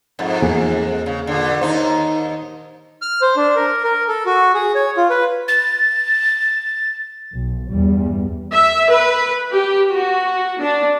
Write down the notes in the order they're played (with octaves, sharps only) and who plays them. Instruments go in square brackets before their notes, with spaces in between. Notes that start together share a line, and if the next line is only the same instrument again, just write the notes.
[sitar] F2 G#2
[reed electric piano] E2 A#3 G#4
[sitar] C#3
A#2 D3
[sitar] D#2 D#4 [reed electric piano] C5
[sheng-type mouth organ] F6
C5
D4
A#4
A#4
A4
F#4
G#4
C#5
F4
B4
[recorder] A6
[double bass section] B1
E2 G2 G3
[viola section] E5
B4
G4
F#4
D4